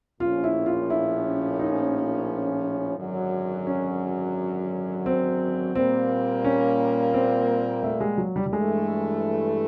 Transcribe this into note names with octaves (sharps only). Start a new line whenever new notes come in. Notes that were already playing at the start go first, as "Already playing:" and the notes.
A#1 A2 F3 A#3 C#4 F4
E4
F4
E4
D#4
G#1 F#2 D3 F#3
C#4
C4
A#2 G3 A#3 C4
C#4
C4
A3
G#3
F#3
G3
G3
G2 E3 G#3 A3